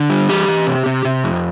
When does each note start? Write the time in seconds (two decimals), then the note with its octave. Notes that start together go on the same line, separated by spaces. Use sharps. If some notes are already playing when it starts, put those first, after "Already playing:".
Already playing: D3
0.10 G3
0.29 E3 G4
0.48 E3
0.67 C3
0.86 C3
1.05 C3
1.24 F2